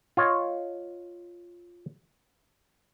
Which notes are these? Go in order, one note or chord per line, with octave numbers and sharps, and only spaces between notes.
F4 C#5 D#5